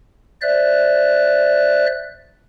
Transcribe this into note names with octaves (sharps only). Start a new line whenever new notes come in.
C5 D5 E5 F#6